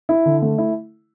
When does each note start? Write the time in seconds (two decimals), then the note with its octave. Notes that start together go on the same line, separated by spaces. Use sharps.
0.09 E4
0.26 D3
0.42 A3
0.58 E4